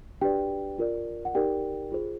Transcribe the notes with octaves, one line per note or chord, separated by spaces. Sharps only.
D4 F#4 G4 B4 D5 G5
F4 A#4 D5
F#5
D#4 G4 A#4 D5 G5
F4 G#4 C5